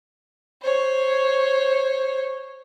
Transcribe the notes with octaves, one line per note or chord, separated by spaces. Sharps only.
C5 C#5